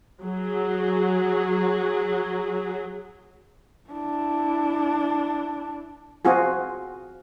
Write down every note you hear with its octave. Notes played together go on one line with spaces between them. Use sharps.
F#3 G#4
D4 E4
C4 F4 F#4 G#4